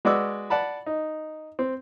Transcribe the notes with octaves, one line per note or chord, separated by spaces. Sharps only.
G#3 F#4 B4 D5 D6 E6
D5 F#5 A5 B5
D#4
C4